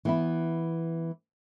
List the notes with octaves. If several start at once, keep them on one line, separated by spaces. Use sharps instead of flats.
E3 B3 E4